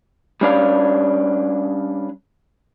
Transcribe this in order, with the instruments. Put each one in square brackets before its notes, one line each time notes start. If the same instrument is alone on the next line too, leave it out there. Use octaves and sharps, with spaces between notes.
[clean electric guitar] G3 C#4 D4 F5